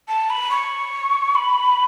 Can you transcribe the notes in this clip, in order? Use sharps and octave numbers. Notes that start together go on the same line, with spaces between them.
A5
B5
C#6
B5